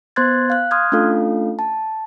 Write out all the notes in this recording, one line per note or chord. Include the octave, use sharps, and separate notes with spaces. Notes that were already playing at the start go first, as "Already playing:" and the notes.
B3 C5 C6 F#6 G#6 A6
F5 F#6
C6 D#6 F6 F#6 G#6
A3 C#4 D4 F4 A4 F5
A5